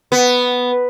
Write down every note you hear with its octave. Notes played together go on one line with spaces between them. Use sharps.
B3